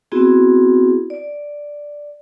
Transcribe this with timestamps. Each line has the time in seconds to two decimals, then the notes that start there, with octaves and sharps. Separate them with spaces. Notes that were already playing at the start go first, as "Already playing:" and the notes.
0.12 B3 C4 E4 F#4 G#4
1.10 D5